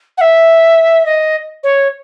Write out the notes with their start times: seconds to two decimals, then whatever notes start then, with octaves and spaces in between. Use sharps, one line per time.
0.18 F#5
0.21 E5
1.06 D#5
1.63 C#5